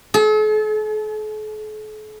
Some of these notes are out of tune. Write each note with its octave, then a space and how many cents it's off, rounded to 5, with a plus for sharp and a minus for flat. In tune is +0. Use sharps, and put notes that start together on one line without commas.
A4 -45